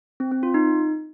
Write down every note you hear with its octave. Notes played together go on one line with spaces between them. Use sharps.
C4
C4
F4
D#4